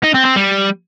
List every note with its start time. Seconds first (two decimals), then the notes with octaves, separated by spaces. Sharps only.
0.03 D#4
0.14 C4
0.25 C4
0.36 G3